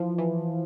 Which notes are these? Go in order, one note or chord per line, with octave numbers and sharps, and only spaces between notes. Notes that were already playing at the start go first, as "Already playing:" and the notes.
Already playing: E3 F3
E3